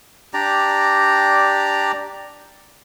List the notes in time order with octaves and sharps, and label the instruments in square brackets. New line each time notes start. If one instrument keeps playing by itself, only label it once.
[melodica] D4 G4 D5 A#5